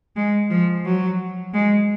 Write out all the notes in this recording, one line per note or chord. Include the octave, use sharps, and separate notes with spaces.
G#3
F3
F#3
G#3